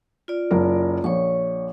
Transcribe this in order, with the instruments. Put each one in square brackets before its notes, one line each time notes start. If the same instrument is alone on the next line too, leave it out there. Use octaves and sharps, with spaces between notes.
[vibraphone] F4 D5
[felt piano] F#1 A#4
[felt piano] A#1 [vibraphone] C#5 C#6